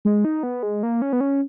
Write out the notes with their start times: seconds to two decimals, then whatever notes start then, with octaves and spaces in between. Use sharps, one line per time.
0.05 G#3
0.25 D#4
0.43 B3
0.63 G#3
0.83 A#3
1.02 C#4
1.13 B3
1.21 C#4